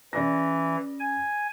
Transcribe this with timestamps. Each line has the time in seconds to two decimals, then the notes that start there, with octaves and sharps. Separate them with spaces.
0.13 C#3 E3 D5 A#6
1.00 G#5